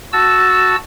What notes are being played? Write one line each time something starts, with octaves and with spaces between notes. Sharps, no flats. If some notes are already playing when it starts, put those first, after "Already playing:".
F#4 A5 E6